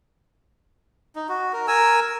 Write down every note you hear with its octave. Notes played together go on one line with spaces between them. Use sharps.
D#4
F#4
A#4
A#4 G#5 E6